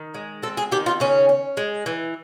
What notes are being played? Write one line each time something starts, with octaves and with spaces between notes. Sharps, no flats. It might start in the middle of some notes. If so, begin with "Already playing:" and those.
Already playing: D#3
G#3
C4 A4
G#4
D#3 G4
F4
C#3 C#4
C#4
G#3
E3